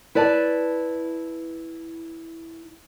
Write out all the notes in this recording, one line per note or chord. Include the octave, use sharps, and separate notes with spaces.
E4 B4 D5 A5